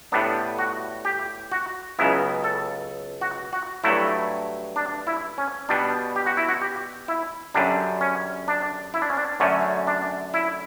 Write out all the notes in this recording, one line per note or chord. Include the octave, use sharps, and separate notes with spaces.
A2 G3 B3 D4
F#4
G4
F#4
C#2 C#3 F#3 B3 E4
A4
F#4
F#4
G2 F#3 A3 E4
D4
E4
C#4
B2 G3 B3 D4
G4
F#4
E4
F#4
G4
E4
F#2 D3 G3 D4
C#4
D4
E4
D4
C#4
D4
F#2 D3 A3 C#4
D4
E4